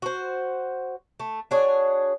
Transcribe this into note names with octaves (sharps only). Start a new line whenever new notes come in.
F#4 C5
A3
D4 F#4 G#4 C#5